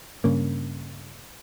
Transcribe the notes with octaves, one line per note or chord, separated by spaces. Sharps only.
G2 C#3 A#3